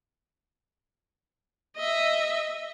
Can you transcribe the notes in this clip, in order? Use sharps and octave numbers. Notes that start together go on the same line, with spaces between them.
D#5 E5